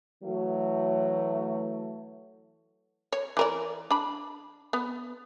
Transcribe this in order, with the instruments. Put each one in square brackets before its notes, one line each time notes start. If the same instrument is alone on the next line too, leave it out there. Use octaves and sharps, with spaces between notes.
[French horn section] E3 F#3 A3
[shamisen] C#5
E3 A#4 D5
D4 B5
B3